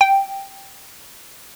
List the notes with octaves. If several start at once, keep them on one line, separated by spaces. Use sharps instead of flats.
G5